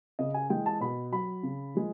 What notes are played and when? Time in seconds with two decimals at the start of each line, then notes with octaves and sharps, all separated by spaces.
0.19 C#3 D#5
0.34 G#5
0.50 E3 G#3 G5
0.66 A5
0.81 B2 B5
1.12 F#3 B5
1.43 C#3
1.75 F3 G#3